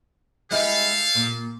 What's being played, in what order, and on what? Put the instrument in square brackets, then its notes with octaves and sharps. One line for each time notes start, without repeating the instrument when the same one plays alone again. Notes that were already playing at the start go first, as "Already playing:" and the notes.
[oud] G3 G#3 E4 [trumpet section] G4 A4 F5
[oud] A#2